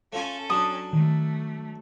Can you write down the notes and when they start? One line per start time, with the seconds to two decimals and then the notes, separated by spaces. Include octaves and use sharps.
0.13 A3 C#4 F4 A4 G#5
0.50 F#3 D4 D#6
0.93 D#3 A3